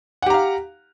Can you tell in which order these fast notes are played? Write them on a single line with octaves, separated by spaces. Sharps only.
F#5 G4 A#5 F5